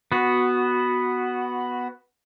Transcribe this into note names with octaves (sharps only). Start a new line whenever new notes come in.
B3 F#4